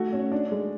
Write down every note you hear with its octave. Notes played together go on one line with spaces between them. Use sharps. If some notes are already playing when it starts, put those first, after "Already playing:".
Already playing: A3 F#4
C#4
D4
G#3